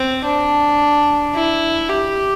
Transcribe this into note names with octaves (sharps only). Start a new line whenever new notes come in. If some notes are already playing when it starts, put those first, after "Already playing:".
Already playing: C4
D4
E4
G4